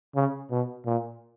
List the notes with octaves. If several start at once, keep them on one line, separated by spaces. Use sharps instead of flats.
C#3
B2
A#2